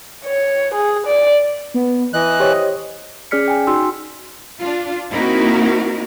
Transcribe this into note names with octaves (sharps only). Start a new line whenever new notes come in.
C#5
G#4
D5
B3
E3 D#5 F#6
G4 C5 C#5
C#4 G#4 D5 F6 B6 C#7
G5 G#5
D#4 F#4 C6 E6
D4 F4
A#3 C4 D#4 E4 F#4 A#4